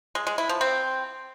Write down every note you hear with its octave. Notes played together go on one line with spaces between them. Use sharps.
G#3
G#3
E4
F3
C4